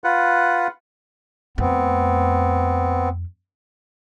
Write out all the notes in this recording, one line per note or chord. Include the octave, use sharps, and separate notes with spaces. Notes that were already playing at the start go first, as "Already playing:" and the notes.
F4 B4 F#5
F2 A3 B3 C4